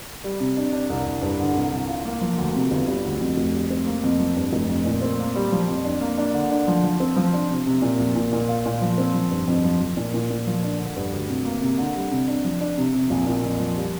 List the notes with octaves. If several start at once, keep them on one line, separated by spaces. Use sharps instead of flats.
G3
C3
D4
D4
C2
C2
G2
D3
C2
C2
F4
A#3
F3
D2
C3
G1
G3
D2
F2
F1
G3
C4
A#3
F2
F3
G2
F1
F2
A#2
C4
A#3
G3
F3
F2
D4
A#3
D4
D3
D4
F3
F3
C4
F3
D4
C3
C3
A#2
A#1
A#2
A#2
F4
A#2
F3
C4
F3
G2
F2
F3
F3
A#2
A#2
A#2
F3
D4
D3
G2
D2
C3
A#3
C3
D3
G3
C3
D4
F3
D4
C3
C3
A#1
A#2
F2
F3
G3